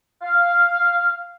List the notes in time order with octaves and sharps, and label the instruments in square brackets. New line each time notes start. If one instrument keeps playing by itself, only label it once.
[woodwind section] F5